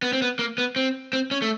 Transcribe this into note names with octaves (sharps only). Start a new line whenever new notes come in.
B3
C4
B3
A#3
B3
C4
C4
C#4
A3